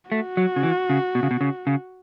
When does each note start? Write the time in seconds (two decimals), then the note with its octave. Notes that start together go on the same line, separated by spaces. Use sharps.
0.12 A3 F#4
0.37 F#3
0.56 C#3
0.63 E3
0.90 C#3
1.15 B2
1.23 C#3
1.31 B2
1.41 C#3
1.67 C#3